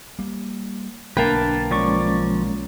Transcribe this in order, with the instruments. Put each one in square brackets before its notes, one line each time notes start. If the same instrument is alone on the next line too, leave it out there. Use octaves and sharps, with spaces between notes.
[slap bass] G3 A#3
[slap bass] B1 D3 [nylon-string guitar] A#3 G5 [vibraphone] D4 [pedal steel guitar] B4 A5
[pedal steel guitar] F3 D5 C#6 [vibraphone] G#3 C#4 C#5